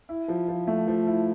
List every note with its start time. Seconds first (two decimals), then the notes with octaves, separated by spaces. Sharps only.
0.09 E4
0.28 F3
0.48 F3
0.67 A3
0.88 F3
1.07 E4